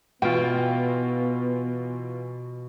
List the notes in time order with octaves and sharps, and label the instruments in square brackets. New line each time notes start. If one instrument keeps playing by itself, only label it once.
[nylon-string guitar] B2 [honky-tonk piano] E3 F4 [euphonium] B3 [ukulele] G5